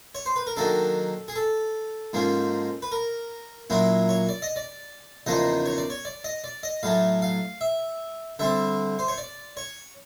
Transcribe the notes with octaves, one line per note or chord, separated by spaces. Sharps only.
C#5
C5
B4
A#4
D#3 F#3 A#3 D4 A4
G#4
A4
G#2 F3 A#3 C#4
B4
A#4
A#2 F#3 A#3 C#4 E4
C#5
D5
D#5
D5
E2 C#3 F3 A#3 D#4 D#5
C#5
D5
C#5
D5
D#5
D5
D#5
A2 F#3 A3 F5
F5
E5
D3 G3 C4 E5
C5
C#5
D5
C#5